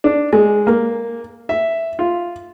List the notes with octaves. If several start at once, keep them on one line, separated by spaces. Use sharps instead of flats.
D4
G#3
A#3
E5
F4